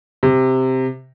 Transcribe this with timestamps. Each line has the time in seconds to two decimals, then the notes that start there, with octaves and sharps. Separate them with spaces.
0.23 C3